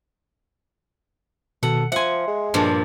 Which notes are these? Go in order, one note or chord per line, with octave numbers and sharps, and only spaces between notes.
B2 D#3 A4 F#5
F3 E5 F#5 G#5 C6
G#3
G2 A#2 F3